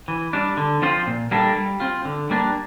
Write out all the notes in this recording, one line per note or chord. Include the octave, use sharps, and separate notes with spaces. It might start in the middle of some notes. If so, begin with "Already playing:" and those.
E3
G3 D4
D3
F3 C4 F4 C5
A#2
G3 A#3 D4 A4
G3
C4 F4
D3
G3 A#3 D4